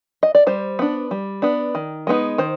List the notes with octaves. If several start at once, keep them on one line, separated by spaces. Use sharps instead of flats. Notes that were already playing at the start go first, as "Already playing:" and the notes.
D#5
D5
G3 C5
B3 D4
G3
B3 D4
D#3
G#3 B3 D#4
D#3 C5